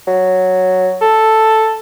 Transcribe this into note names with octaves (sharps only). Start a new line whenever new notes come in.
F#3
A4